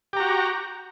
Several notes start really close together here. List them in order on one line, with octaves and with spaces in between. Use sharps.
G4 A#5 F#4